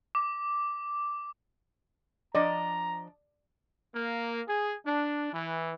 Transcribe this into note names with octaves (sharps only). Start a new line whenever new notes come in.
D6
F3 D4 D5 D#5 A#5
A#3
G#4
D4
E3